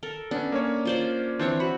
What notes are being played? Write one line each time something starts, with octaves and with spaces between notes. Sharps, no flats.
A4 A#4
B3 C#4 D4
A#3 C#4 C#5
F4 C5 D5
E3 C4 D4 C5 C#5
F#4 B5